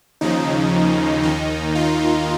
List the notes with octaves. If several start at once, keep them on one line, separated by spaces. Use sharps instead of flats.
D#2 C#3 F3 D#4
D#2 D#3 D#4
F4